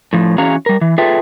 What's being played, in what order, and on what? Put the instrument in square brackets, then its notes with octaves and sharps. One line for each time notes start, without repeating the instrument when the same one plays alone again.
[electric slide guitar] A2 F3
E3 C#4 F#4 G#4 F5 A#5
G3 A#4
E3
F4 G#4 A4 B4 E5 G5